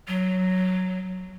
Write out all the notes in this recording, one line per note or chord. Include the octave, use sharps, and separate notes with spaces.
F#3